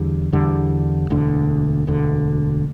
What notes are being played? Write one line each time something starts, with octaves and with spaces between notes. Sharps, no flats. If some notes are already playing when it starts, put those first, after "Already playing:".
Already playing: E2 D3 G3
E2 D3 G3
E1 D2 D3
E1 D2 D3